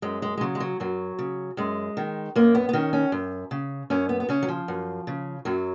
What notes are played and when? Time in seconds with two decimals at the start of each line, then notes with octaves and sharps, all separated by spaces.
0.02 F#2 G#3
0.22 G#3
0.37 G#3
0.41 C#3 F#3
0.55 G#3
0.60 F#3
0.80 F#2 F#3
1.19 C#3
1.57 F#2 G#3
1.97 D#3
2.35 F#2 A#3
2.55 B3
2.69 B3
2.73 D#3 C#4
2.93 C#4
3.12 F#2
3.51 C#3
3.90 F#2 C#4
4.09 B3
4.20 B3
4.29 C#3 C#4
4.43 F#3
4.48 F3
4.68 F#2
5.07 C#3
5.45 F#2 F#3